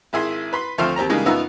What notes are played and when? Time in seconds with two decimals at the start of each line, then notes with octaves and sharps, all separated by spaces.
0.13 G#1 E4 G#4 C6
0.53 B4 B5 C6
0.78 D2 F3 A3 C4 C6 F6
0.96 D#2 C4 G4 A#5
1.09 C#3 E3 G3 G#3 A#3 D#4
1.26 F#2 B3 D#4 F4 E5 A#5